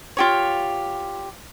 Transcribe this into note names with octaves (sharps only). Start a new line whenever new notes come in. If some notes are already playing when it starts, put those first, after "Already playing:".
F4 G4 C#5